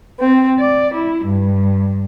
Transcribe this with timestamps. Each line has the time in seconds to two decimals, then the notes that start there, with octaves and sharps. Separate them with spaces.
0.19 C4
0.58 D5
0.94 E4
1.25 G2